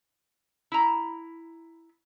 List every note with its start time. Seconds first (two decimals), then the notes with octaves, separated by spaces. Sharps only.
0.72 E4 A#5